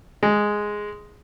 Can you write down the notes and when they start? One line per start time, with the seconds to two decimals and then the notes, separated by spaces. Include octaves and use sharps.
0.23 G#3